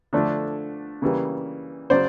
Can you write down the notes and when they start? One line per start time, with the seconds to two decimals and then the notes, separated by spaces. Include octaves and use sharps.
0.13 D3 F3 A3 D4
1.02 C#3 E3 G3 A#3
1.90 C#3 F#3 C5 D5